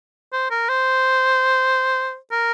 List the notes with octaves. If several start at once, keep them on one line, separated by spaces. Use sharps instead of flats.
C5
A#4
C5
A#4